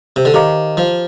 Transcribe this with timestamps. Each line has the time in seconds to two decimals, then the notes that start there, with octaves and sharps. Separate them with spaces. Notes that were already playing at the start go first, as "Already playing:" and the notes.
0.16 C3
0.25 D3
0.34 D#3 G4 C5 F5 A#5 D6
0.77 F3